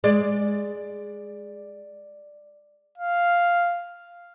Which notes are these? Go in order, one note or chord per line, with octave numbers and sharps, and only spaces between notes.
G#3 D5
F5